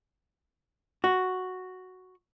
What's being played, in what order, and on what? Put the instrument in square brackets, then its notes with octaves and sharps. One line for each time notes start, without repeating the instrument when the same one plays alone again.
[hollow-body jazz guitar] F#4